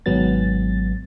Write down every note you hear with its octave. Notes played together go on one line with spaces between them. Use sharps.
G#1 G#2 F#3 B3 A6